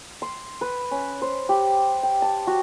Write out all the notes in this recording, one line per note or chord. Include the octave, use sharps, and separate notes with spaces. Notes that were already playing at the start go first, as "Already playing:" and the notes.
C6
B4
C#4
C5
G4
G5
A5
F#4